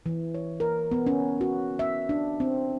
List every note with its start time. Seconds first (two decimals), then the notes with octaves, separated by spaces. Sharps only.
0.06 E3
0.34 C#5
0.60 A#4
0.91 B3
1.07 C#4
1.41 F#4
1.79 E5
2.09 D4
2.40 C4